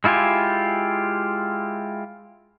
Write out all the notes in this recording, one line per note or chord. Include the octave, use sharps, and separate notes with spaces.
G#3 E4 F4 G4 G#5